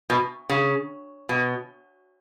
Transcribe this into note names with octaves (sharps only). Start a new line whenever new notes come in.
B2
C#3
B2